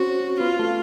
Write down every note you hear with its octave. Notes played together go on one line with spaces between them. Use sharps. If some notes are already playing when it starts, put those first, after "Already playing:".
Already playing: C4 C#4 F#4 C5 C#5
B3 F4 B4
A3 A4